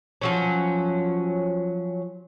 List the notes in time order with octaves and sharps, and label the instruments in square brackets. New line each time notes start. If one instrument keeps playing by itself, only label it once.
[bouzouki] F3 F#3 C#4